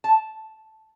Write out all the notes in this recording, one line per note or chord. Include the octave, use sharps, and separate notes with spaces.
A5